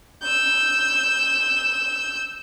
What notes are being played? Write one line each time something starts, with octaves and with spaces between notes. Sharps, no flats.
E6 G6